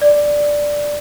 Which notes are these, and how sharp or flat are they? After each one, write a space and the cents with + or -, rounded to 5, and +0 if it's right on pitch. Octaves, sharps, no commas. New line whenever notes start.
D5 +0